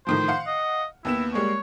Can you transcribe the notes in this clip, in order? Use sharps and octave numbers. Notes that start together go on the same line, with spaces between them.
A2 D#3 F3 C5
F5 F#5
D#5
D#2 B3 E4 E7
G3 G#3 A#3 C#5